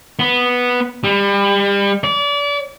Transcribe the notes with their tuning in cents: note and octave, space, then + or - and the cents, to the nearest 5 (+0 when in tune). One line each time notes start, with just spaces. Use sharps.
B3 -5
G3 +30
D5 -35